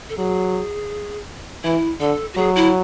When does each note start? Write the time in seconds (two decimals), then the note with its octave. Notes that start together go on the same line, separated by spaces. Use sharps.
0.09 A4
0.17 F#3 G#4
1.64 E3 E4
2.00 D3 A4
2.33 F#4
2.37 F#3 G#4
2.56 E4